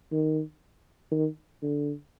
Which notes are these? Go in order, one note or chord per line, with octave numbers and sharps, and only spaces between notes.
D#3
D#3
D3